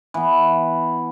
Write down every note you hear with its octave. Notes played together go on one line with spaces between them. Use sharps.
E3 B3